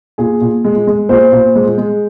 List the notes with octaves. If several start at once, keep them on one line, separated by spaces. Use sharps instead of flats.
A#2 G#4
A#2
G#3
G#3
A#2 C5
A#2
G#3
G#3